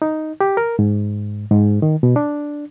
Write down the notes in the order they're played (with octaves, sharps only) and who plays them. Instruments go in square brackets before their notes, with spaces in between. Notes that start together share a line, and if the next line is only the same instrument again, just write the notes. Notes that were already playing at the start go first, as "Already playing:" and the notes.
[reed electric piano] D#4
G4
A#4
G#2
G#2
D#3
B2
D4